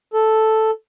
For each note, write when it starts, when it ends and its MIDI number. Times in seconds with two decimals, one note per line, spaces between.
0.14 0.71 69